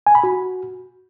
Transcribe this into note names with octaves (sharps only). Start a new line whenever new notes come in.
G#5
B5
F#4